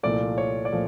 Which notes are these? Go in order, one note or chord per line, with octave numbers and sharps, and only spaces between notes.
C2 A#2 F3 A3 D5
C#5
D5
A#2 F3 A3